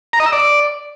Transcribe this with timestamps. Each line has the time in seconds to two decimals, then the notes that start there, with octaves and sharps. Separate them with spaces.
0.13 A#5
0.20 D#5
0.26 E6
0.32 D5